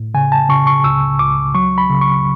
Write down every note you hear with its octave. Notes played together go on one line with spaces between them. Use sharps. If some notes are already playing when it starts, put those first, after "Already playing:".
Already playing: A2
C#3 G#5
A5
C#3 C#6
C#6
C#2 E6
C#2 D6
F#3 C#6
B5
C#3
C#6